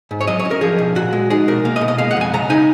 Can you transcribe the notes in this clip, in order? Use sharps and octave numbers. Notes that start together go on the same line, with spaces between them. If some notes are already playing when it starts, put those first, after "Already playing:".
G#2
C#5
F#3 D#5
C#5
C#4
A#4
F3 G#4
B1
A#2 F#4
G#3
D#4 G#4
B2 A#4
A#3 F5
D#5
B2
D#5
G#3 F5
F#5
F2 G#5
C#3 A#5
D#4 G#5